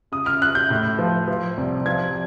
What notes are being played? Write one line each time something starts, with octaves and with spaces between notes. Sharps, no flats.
C#3 D#6
F6
C#3 F#6
G6
A2
F3
F3
C2
F3 G#6